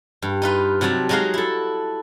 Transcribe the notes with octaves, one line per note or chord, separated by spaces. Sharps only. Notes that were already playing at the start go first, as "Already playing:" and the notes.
G2
D#4 F4 B4
C3 F#3 F#4 A5
F#3 G#3 D#4 F#4 F5
E4 A4